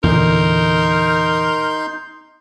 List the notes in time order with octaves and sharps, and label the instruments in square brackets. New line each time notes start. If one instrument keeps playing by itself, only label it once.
[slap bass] E2 A#2 D3 [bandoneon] D#4 C6 G6 [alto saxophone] A#4